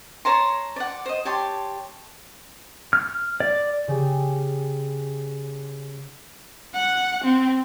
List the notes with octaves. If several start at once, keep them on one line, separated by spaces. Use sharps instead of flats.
C#5 A5 A#5 C6
D5 F#5
C5 D#5
G4 C#5 A5 C6
F6
D5
C#3 G4 G#4
F#5
C4